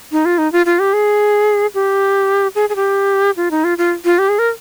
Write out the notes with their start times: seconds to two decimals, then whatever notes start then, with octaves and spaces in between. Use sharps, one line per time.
0.12 D#4
0.25 F4
0.38 D#4
0.52 F4
0.66 F4
0.79 G4
0.93 G#4
1.74 G4
2.55 G#4
2.69 G#4
2.76 G4
3.37 F4
3.51 D#4
3.64 F4
3.78 F4
4.05 F4
4.19 G4
4.29 G#4
4.39 A#4